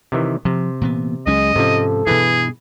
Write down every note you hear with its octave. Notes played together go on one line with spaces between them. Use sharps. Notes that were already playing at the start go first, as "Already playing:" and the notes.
C3 D#3 E3
C3 F3
A#2 E3 B3
C#2 F#3 G#3 C#4 D#5
G#2 C3 F3 C#4 A4
G2 B2 E3 G#4 B4